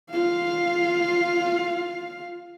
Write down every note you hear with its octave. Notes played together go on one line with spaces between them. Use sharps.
F4 F5